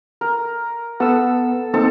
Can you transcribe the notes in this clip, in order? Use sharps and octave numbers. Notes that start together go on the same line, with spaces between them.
A#4
B3 A4 B4 F#5 E6
A#3 C4 D#4 A4